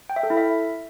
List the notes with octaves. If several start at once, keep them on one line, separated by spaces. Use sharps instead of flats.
G5
E5
A4
E4
E5